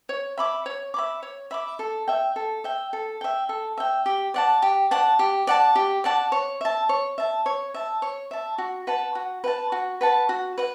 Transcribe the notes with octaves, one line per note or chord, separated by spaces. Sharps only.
C#5
E5 B5 D6
C#5
E5 B5 D6
C#5
E5 B5 D6
A4
E5 G5
A4
E5 G5
A4
E5 G5
A4
E5 G5
G4
D5 F#5 A5
G4
D5 F#5 A5
G4
D5 F#5 A5
G4
D5 F#5 A5
C#5
E5 A5
C#5
E5 A5
C#5
E5 A5
C#5
E5 A5
F#4
B4 F#5 A5
F#4
B4 F#5 A5
F#4
B4 F#5 A5
F#4
B4 F#5